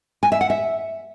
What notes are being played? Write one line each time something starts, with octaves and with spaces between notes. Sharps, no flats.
G#5
E5
F#5
E5